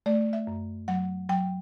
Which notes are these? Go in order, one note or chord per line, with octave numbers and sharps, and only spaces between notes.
A3 D5
E5
F#2
F#3 F#5
F#3 G5